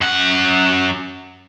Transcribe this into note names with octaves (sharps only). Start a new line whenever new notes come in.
F#2 F#5